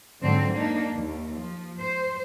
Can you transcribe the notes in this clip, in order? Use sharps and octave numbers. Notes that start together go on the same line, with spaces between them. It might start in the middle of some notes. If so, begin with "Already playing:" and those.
F2 G#2 D3 F#3 C4
A#3 D4 D#4
D#2
F3
C5